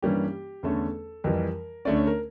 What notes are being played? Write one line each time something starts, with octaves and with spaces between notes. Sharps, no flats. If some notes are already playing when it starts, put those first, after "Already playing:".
G2 E3 G3 A#3 C#4 G4
E2 D3 A3 C#4 A4
F2 E3 G3 A#4
D2 D3 A3 C#4 D5
C#5
A#4